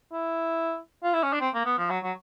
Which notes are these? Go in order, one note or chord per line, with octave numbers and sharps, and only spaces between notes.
E4
F4
E4
C#4
D4
C4
A#3
B3
F3
F#3
F#3